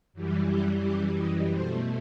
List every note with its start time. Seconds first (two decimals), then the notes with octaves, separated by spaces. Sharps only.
0.13 F#2 E3 G3
0.47 G4
0.83 G4
1.17 D#5
1.52 B2 A3 C5